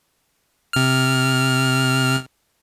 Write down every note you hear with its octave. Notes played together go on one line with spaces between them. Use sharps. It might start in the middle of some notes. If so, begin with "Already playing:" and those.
C3 F6